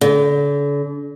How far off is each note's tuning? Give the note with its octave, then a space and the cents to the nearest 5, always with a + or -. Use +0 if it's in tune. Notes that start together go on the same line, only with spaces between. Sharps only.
D3 -40